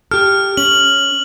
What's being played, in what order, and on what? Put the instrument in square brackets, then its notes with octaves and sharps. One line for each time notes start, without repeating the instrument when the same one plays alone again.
[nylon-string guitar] G4 A4 [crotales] F6
[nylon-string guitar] C#4 [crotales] F#7